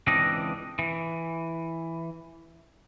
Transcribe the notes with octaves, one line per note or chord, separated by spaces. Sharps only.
C#2 E3 C4 D4 D#5
E3